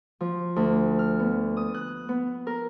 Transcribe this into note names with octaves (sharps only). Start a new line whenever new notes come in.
F3
D2
F6
B3
D#6
F#6
B3
A#4